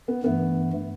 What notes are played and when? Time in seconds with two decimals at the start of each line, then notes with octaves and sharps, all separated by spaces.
0.08 B3
0.23 G2 E3 A3 B3